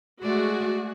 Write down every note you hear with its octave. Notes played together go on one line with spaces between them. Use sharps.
G#3 A3 F#4 G#4 D5